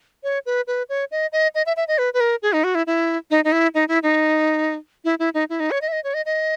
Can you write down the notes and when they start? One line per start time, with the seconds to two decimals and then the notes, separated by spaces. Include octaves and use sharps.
0.23 C#5
0.46 B4
0.67 B4
0.89 C#5
1.11 D#5
1.32 D#5
1.55 D#5
1.66 E5
1.77 E5
1.88 D#5
1.98 B4
2.14 B4
2.20 A#4
2.42 G#4
2.53 D#4
2.64 F#4
2.75 E4
2.87 E4
3.31 D#4
3.45 D#4
3.52 E4
3.74 D#4
3.88 E4
4.03 D#4
5.05 E4
5.19 E4
5.34 D#4
5.50 E4
5.60 D#4
5.71 C#5
5.82 D#5
5.88 E5
5.93 D#5
6.04 C#5
6.14 D#5
6.26 D#5